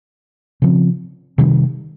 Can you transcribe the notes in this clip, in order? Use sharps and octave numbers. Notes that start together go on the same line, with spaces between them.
C#3 F3 C4
C3 D#3 G3